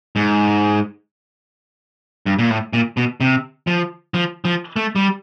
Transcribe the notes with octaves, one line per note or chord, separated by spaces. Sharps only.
G#2
G2
A#2
A2
A#2
B2
C3
F3
F3
F3
A3
G3